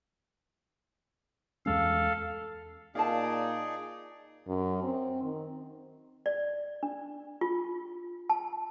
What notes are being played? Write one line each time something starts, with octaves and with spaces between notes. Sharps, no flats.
E2 G#3 C#4 A4 F5
A#2 D#4 G#4 D5 F5 A5
F#2
C4
D#3
D5
D4
F4
A5